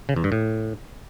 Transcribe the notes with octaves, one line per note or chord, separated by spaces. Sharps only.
C#3
E2
G2
A2